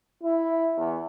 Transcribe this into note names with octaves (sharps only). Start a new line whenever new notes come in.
E4
E2